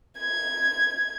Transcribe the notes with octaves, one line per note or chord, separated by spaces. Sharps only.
G#6